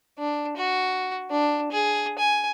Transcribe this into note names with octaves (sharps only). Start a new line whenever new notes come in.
D4
F#4
D4
G#4
G#5